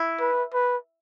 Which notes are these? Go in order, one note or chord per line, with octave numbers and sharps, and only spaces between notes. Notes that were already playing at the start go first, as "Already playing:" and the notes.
Already playing: E4
B4
B4